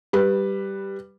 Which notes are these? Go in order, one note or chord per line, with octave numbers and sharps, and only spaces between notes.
G3 B4